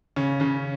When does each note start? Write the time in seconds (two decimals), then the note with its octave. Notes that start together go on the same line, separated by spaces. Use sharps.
0.16 C#3 C#4
0.40 C#3 C#4